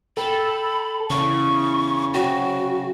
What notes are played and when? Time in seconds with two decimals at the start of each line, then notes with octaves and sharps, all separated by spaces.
0.17 A4 G5 B5
1.10 E2 C#3 C#6
2.14 C3 F#3 F#4 G5